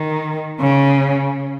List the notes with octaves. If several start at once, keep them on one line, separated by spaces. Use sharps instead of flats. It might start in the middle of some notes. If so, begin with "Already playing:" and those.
Already playing: D#3
C#3